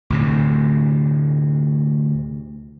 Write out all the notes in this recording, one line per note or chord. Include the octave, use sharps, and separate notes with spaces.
D2 A2 C3